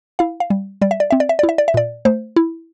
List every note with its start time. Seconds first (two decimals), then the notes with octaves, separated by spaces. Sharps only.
0.19 E4 F5
0.40 F5
0.50 G3
0.82 G3 D5
0.91 E5
1.00 D5
1.10 C4 E5
1.20 D5
1.29 E5
1.39 E4 D5
1.49 E5
1.58 D5
1.68 E5
1.74 A#2 D5
2.05 A3 C5
2.36 E4